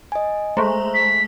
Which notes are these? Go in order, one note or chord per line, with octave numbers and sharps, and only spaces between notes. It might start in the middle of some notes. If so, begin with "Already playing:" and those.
D#5 G#5
G#3 A3 C5 A#5
B6